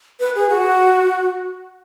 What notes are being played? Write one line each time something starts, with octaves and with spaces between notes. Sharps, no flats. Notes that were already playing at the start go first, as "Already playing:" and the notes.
B4
G#4
F#4